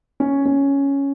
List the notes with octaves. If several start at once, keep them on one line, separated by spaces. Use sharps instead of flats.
C#4
C#4